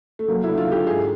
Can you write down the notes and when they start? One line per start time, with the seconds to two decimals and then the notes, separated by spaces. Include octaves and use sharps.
0.19 A3
0.28 F#3 A#3
0.44 E4
0.48 D3
0.58 F4
0.67 D3 G4
0.86 G#2 G#4